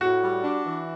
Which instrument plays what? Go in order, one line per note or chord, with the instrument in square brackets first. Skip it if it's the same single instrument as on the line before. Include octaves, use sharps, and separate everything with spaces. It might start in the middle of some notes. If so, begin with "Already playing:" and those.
[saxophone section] A2 [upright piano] F#4
[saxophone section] G3
D4
E3